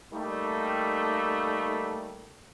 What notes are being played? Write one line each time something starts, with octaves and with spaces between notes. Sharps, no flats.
G3 A3 A#3 D#4